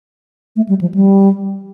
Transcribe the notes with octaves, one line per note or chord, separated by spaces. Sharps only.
A3
G3
F3
G3